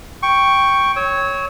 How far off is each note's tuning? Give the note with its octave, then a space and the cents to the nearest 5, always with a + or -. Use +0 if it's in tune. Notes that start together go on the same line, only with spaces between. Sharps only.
G5 +0 C#6 +0
C#5 +0 E6 -35